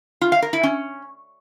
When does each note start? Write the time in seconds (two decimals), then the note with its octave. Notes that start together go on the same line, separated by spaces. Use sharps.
0.21 F4
0.32 F5
0.42 A#4
0.53 E4
0.63 C#4